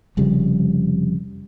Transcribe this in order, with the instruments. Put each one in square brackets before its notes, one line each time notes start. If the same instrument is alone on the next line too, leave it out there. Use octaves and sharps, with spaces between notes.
[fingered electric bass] F1 F2 C#3 G3